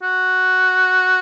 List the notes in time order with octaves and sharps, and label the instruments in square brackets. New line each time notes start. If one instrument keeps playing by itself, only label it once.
[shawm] F#4